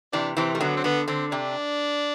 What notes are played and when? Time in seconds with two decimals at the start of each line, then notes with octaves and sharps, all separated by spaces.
0.13 C3 E3 D4
0.37 C3 E3 C4
0.53 G3 A3
0.60 D3 F#3 B3
0.77 C4
0.84 D3 B3
1.08 D3 C4
1.31 C3 D4